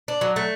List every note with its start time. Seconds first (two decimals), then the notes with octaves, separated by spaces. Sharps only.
0.08 D4
0.21 F#3
0.36 A3